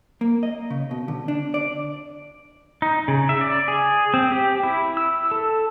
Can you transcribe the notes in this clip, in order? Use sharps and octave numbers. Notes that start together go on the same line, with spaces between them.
A#3
D#5
C#3
B2
D3
D4
D5
D#4
C#3
E5
D5
G#4
C4
G4
E4
E6
A4